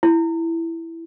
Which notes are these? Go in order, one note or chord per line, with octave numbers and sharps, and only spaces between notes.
E4